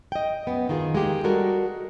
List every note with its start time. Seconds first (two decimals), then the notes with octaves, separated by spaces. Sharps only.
0.12 D#5 G5
0.47 F#2 B3
0.69 D#3 F4 G#4
0.94 G#3 A#3 G4
1.24 G3 G#3 F#4 A4 A#4